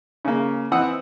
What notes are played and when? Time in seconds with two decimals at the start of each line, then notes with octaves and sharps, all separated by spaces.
0.25 C#3 A#3
0.72 E3 C4 F#5 D#6 E6